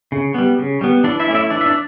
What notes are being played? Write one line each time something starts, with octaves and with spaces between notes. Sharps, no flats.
C#3
G3 B3
C#3
G3 B3
E3 D4 D5
E4 E5
A3 C#4 D5
E4 E5
E3 D4 D5
E5
D4 D5